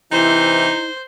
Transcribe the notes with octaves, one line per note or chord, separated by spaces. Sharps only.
C3 E3 D#4 E4 C5